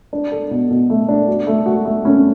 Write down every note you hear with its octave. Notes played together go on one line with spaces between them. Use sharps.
D4
A4
B2
B2
A3
D4
F#4
A3
F#4
A3
C#4